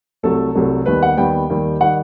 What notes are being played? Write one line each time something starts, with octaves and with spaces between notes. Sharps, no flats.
C2 C3 F#3 A3 A4
C2 C3 F#3 A3
D#2 D#3 G3 B3 B4
F#5
D#2 D#3 G3 B3 G5
D#2 D#3 G3
D#3 G3 F#5